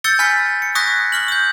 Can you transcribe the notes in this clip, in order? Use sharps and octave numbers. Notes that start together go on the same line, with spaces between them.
E6 G6 A6 C#7 G7
G#5 B5 F6 B6 C#7
C#7
C#6 D#6 F#6 G#6 A#6 B6
C#6 F6 F#7
D#6 G6